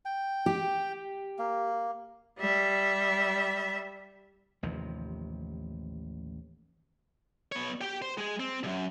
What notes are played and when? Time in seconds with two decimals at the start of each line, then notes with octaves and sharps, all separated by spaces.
0.05 G5
0.46 G4
1.39 A#3
2.39 G3 E5
4.63 A1 D#2 C3 F3
7.52 B3 C#5
7.81 G4 G5
8.02 C5
8.18 G#3 G#4
8.40 C4
8.63 C2 F#2